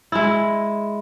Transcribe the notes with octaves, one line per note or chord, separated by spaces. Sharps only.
G#3 E4